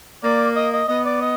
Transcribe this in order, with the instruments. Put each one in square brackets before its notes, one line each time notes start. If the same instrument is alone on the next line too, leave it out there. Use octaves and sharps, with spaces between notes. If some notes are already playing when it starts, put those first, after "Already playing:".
[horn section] A#3 [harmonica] D5
[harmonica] D#5
D#5
[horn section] B3 [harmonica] D#5
[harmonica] D5
D#5